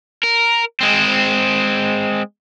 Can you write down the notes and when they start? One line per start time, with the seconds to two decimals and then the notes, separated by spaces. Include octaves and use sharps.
0.24 A#4
0.81 G#3 C4